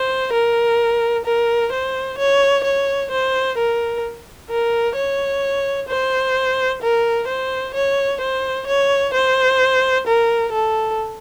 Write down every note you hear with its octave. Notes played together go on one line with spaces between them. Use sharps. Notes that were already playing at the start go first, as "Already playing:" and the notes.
Already playing: C5
A#4
A#4
C5
C#5
C#5
C5
A#4
A#4
C#5
C5
A#4
C5
C#5
C5
C#5
C5
A#4
A4